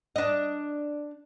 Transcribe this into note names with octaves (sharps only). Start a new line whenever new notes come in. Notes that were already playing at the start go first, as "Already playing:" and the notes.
D4 D#5